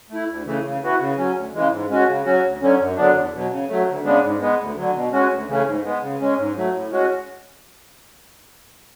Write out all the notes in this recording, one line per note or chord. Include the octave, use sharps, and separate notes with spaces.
A3 E4
D2
C#3 E3 A3
C#3
E3 B3 F#4
C#3
F#3 C#4
D2
C#3 E3 G#3
G#2
G#3 C#4 F#4
C#3
F#3 C#4 F#4
D2
D3 F#3 C#4
F#2
D3 F#3 B3 D4
E2
B2 F#3
C#3
F#3 A3
D2
C#3 G#3 B3 D4
G#2
G#3 B3
D2
D3 F#3
B2
G#3 C#4 F#4
D2
C#3 E3 A3 C#4
G#2
G#3 B3
C#3
G#3 C#4
G#2
F#3 A3
A2
G#3 C#4 F#4